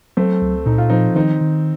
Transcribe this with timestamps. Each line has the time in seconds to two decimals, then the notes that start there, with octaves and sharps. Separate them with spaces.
0.17 F#3 A3 C4
0.42 C#2
0.66 A#2 D#4
0.78 F4
0.89 F3 C4 D#4
1.15 D#3 C4 D#4
1.41 D#3